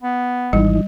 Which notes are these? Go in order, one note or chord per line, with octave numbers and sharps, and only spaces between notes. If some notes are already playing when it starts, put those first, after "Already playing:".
B3
G#1 E3 G3 D#4